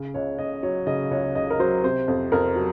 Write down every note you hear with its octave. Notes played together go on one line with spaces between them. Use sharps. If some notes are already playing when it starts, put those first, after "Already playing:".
Already playing: C#3
C#2 C#5
C#2 D#5
F#3 C#5
C#3 D#5
C#2 C#5
C#2 D#5
A#4
F#3 C5
C3 C5
F2
F2 A#4
F#3